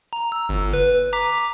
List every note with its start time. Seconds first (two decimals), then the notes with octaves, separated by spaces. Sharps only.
0.13 A#5
0.32 E6
0.49 G1
0.74 B4
1.13 A#5 D6 B6